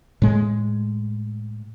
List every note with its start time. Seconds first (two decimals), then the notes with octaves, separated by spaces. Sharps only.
0.22 A2 G#3